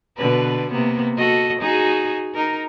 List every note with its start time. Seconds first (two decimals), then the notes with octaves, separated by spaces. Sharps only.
0.17 B2 D3 B4
0.71 C3 A#3 B3
1.17 F#4 A4 D#5
1.60 D#4 F#4 G#4
2.35 D#4 A#4